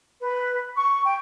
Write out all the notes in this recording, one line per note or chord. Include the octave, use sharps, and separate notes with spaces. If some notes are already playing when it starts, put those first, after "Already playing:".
B4
C#6
G5